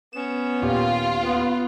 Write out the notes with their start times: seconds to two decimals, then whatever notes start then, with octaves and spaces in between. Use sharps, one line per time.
0.13 B3 C#4 E7
0.62 D#2 A#2 F4 G4
1.22 B3